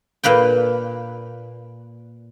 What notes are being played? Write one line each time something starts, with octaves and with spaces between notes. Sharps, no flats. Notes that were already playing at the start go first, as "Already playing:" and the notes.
A#2 A#3 B4 G5